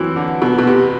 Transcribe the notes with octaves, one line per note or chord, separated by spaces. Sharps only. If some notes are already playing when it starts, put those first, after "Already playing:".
Already playing: E3 F#3 C4
D3
B2
B2
C3